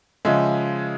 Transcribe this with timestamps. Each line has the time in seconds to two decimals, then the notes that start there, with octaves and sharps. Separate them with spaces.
0.25 C#3 F3 G#3 E5